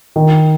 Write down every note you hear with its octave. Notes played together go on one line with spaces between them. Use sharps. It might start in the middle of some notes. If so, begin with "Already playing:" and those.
D#3